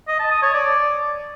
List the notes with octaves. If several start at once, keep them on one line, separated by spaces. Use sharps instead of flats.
D#5
A5
D#6
C#5
D5